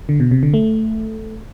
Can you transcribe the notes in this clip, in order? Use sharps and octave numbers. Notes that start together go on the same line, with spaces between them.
D3
B2
C3
D3
A3